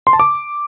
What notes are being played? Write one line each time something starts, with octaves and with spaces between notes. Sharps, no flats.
C6
A5
D6